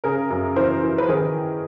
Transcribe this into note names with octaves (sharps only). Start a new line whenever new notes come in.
C#3 G#4 A#4
F#2
E3 A#4 C5
E3
B4
D#3 G#4 A#4